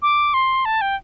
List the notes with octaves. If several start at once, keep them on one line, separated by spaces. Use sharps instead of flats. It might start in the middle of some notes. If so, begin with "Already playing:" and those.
D6
C6
A5
G5